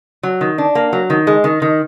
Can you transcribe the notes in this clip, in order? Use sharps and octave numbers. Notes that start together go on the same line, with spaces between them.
F#3
D#3
D4
A#3
F#3
D#3
G#3
D#3
D#3